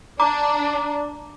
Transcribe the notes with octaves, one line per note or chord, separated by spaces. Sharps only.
D4 A#5 D6